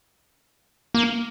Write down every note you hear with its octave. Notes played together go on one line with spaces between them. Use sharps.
A#3